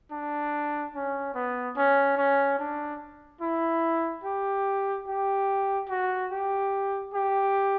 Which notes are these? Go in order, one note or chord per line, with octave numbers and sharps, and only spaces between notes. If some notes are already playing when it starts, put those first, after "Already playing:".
D4
C#4
B3
C#4
C#4
D4
E4
G4
G4
F#4
G4
G4